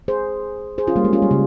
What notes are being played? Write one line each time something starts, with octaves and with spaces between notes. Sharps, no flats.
G#4 C5
G#4 C5
C#4 F4
G3 A#3
G#3
C#4 F4
G3
C#3